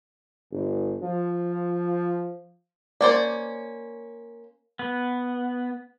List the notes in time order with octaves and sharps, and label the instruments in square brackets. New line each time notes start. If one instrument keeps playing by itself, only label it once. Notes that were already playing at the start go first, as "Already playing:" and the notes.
[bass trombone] G1
F3
[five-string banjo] A#3 C#4 C5 [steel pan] D5
[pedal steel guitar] B3